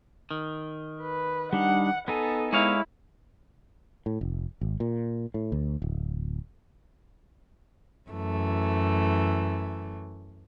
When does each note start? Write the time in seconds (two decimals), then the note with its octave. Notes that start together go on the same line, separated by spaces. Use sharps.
0.31 D#3
1.01 B4
1.53 G3 D4 D#4 F#5
2.08 B3 D#4 A4 G#5
2.53 G#3 E4 C#5 F5
4.06 A2
4.21 F1
4.61 G#1
4.80 A#2
5.34 A2
5.52 D2
5.82 D1
8.10 F#2 E3 A3